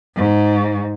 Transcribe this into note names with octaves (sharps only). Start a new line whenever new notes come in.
G#2